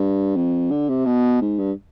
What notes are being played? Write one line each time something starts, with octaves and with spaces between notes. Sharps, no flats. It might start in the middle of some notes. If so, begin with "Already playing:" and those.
Already playing: G2
F2
D3
C3
B2
G#2
G2